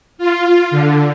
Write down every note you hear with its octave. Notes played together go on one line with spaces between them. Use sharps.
F4
D3